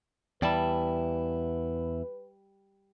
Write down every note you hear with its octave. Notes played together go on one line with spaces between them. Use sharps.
E2 G3 E4 B4 A5